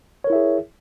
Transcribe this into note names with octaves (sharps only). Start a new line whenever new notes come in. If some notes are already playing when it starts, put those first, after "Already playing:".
E4 G#4 A#4 C#5 E5